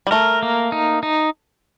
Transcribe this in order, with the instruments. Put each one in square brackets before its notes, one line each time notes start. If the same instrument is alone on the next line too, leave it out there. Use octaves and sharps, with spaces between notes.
[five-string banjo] G3
[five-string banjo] A3 [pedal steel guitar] A#4
[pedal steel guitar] A#3
D#4
D#4